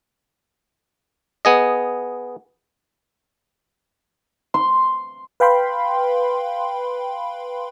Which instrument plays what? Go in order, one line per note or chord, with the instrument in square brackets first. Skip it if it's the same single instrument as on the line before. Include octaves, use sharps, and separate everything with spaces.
[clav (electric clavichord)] B3 G#4 D#5
[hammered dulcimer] C6
[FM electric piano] B4 F5 G5 B5 C6